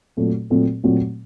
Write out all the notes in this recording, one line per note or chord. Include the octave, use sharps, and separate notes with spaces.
A#2 F#3 A3 C4
A#2 F#3 A3 C4
A#2 F#3 A3 C4